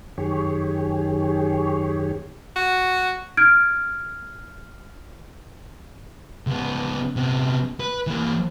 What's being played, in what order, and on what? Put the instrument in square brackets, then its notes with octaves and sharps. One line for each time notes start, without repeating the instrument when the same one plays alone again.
[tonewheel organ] F#2 D#3 G4 G#4 C#5
[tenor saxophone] F#4
[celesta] F6 G#6 D7
[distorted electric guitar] C#2 B3
C3 B3
B4
E3 A#3